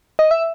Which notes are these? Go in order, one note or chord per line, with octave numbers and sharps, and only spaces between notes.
D#5
E5